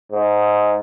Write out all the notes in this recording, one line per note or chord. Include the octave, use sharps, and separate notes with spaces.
G#2